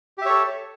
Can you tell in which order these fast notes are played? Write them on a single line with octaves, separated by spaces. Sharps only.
G4 E5 C#5 A4